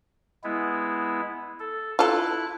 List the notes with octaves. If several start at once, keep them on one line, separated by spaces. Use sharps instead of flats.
G#3 B3 E4
A4
E4 F4 A4 F#6